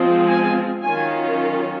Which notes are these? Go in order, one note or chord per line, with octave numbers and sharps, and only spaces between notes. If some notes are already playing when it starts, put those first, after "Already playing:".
Already playing: F3 G#3 C4 F4
G#5
D#3 F#3 C#4 F4 G#5